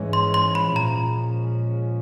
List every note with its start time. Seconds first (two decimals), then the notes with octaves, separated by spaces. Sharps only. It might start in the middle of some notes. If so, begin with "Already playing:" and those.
Already playing: G#2 E3 G#3 C#4
0.13 C6
0.34 C6
0.55 B5
0.76 A#2 F3 G#3 C#4 A#5